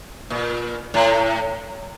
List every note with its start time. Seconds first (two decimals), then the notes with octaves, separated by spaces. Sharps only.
0.30 A#2
0.94 A2